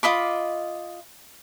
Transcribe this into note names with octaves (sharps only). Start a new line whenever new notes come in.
F4 D#5 B5 D6